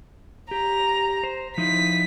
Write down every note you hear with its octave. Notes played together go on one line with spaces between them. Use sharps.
G4 A#5
C5
F3 D#4 E4 B6